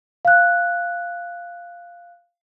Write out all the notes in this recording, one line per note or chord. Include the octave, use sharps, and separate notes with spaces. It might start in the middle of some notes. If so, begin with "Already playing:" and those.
F5 F#6